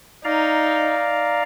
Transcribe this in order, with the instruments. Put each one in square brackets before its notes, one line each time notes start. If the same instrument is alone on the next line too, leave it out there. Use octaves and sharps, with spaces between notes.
[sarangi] D#4 [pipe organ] D5 F5 A#5